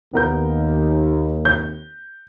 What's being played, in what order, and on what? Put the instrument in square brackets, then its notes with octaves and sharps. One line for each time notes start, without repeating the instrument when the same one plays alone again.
[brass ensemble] D#2 [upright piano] B3 A#4 G6
[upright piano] G6